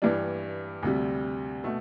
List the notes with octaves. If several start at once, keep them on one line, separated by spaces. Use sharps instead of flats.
G2 E3 G3 D4
D2 C3 G3
B2 A3